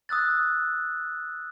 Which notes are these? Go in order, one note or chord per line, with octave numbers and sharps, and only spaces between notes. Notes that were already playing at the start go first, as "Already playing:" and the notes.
D#6 E6 F#6 A6